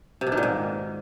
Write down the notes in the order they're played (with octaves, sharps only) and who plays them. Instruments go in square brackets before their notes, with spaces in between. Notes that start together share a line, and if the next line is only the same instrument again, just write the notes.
[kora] C3
B2
D#3
A#2
G#2